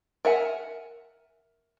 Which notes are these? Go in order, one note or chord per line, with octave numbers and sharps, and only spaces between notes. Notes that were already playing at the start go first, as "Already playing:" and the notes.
A#4 E5 F#5 G#5